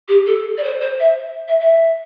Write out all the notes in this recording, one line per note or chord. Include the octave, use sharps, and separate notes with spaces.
G4
A4
D5
C5
C5
E5
E5
E5